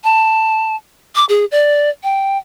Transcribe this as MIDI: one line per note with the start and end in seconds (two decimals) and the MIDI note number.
0.04 0.76 81
1.15 1.25 86
1.29 1.45 68
1.51 1.89 74
2.03 2.38 79